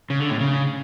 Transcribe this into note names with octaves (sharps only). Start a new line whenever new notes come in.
C#3
D3
A2
C#3